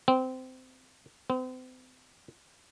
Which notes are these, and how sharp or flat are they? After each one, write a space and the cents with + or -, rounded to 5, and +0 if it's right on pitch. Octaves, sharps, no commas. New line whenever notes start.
C4 -20
C4 -40